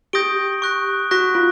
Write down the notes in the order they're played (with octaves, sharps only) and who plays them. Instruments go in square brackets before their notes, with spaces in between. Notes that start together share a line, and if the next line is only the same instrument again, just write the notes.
[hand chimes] G4 [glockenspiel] D#6 G6 A#6 D7 G7
[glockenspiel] C#6 F#6 A#6
[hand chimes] F#4 [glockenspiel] C#6 F#6 A#6
[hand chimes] F4